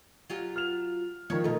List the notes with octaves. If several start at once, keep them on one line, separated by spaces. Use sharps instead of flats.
F#3 F4 G4
F6 F7
D#3 F3 C#5
B2 A3 D#4 F4 A#4